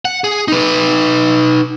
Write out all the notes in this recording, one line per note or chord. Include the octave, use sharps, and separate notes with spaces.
F#5
G#4
D#4 B4